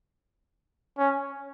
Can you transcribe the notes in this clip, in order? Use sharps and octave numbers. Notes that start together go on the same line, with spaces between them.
C#4